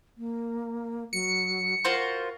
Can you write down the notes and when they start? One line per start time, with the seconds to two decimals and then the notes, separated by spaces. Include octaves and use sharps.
0.17 A#3
1.13 F#3 C#7
1.85 F4 F#4 A#4 C5